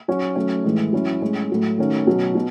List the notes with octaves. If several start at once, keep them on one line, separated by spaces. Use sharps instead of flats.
F#3 C#4 F#4
F#3 A3 C#4
A2 E3 G#3
F#3 C#4 E4
A2 G#3 C#4
A2 F#3 A3
D#3 A3 C#4 F#4
B2 F#3 C#4
B2